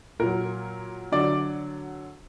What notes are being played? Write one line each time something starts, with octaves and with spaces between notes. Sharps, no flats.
A#2 F#3 A#4
D3 F#3 D5